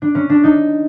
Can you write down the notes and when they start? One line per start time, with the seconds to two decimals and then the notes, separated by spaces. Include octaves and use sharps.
0.02 D4
0.15 C#4
0.29 D4
0.44 D#4